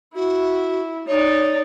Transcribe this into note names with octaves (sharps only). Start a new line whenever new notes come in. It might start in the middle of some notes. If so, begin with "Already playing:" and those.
E4 F#4
D#4 C#5 D5